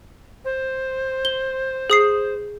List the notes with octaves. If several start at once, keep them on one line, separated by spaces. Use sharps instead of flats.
C5
G7
G#4 D#6 C7